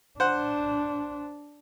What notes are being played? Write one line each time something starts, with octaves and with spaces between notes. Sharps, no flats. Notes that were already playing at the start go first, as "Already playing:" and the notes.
D4 C5 F#5